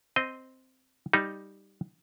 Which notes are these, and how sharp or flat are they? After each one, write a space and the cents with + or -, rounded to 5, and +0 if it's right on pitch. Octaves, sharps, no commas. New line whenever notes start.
C4 -5 D#5 +0
G3 +0 D#4 +0